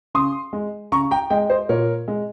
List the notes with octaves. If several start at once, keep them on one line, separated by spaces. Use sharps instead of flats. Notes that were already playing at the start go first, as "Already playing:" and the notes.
C#3 C6 D#6
G#3
C#3 A#5 C#6
G5 A#5
G#3 D#5 G5
C5 D#5
A#2 A#4 C#5
G#3